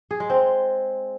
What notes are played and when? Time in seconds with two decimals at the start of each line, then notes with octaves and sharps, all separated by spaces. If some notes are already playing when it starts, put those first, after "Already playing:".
0.11 G#4
0.20 G#3
0.30 C4